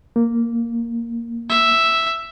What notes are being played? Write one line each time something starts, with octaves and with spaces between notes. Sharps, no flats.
A#3
E5